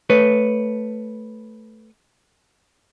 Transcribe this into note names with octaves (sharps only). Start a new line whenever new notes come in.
A3 B4 C#5